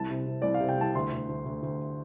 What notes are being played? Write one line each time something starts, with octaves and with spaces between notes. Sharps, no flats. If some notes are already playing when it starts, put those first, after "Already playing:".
Already playing: C2 A5
C3
C3
C2 D5
F5
C3
G5
C2 A5
D2 C6
D2
D2
D2
D2